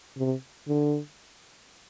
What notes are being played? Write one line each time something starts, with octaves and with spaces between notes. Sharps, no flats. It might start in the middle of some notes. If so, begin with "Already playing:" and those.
C3
D3